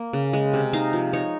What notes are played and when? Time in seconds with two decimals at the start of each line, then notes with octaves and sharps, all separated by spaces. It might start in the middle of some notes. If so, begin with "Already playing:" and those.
Already playing: A#3
0.13 C#3
0.33 G#3
0.53 C3
0.73 D#4 F5
0.93 F3
1.13 D#4 C#5